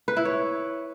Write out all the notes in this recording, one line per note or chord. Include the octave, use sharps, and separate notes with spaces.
B4
E4
C#5